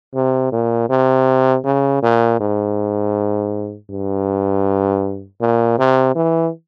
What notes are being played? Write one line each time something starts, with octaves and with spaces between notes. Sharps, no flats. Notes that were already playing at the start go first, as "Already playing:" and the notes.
C3
A#2
C3
C#3
A#2
G#2
G2
A#2
C3
E3